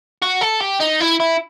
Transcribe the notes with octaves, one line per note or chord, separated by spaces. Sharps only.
F#4
A4
G4
D#4
E4
E4